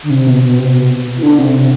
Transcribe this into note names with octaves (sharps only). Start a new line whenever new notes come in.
D3
C3
B2
B2
C3
B2
E3
D3
C3
C3